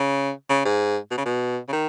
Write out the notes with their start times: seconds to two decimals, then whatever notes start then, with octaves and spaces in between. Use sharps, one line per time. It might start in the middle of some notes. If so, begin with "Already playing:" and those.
Already playing: C#3
0.50 C#3
0.65 G#2
1.11 B2
1.18 C#3
1.26 B2
1.68 C#3
1.73 D#3